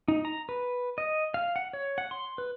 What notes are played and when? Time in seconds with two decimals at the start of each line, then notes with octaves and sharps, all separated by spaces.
0.08 D#4
0.25 A#5
0.49 B4
0.98 D#5
1.34 F5
1.56 F#5
1.73 C#5
1.98 F#5
2.11 C6
2.38 B4